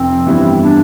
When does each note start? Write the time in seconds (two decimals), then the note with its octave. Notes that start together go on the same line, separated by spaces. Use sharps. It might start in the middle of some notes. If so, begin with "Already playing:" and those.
Already playing: F1 F2 C4
0.26 G2 E3 G3 B3 E4
0.64 D4